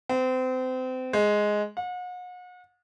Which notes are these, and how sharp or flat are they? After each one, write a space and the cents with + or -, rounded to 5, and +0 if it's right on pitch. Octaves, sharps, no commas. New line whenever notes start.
C4 -30
G#3 +5
F#5 -40